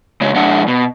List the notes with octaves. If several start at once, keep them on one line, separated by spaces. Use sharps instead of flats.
C#3 G#3 F#4
F2 G#3 D4 F#5
B2